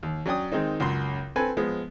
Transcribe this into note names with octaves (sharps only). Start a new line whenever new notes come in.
D#2
F#3 C#4 D5 G5 D#6
D#3 G#3 C4 D#4
C#2 F#2 C6
C4 A4 B4 G#5
F3 G#3 B3